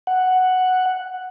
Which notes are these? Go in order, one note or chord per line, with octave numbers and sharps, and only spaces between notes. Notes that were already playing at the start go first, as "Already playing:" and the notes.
F#5